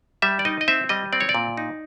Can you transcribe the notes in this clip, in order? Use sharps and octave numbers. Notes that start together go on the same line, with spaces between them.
G3 E5
D5
D#4 D#5
D#5
C4 E5
G3 D#5
C4 D5
C#5
D5
A#2
D#4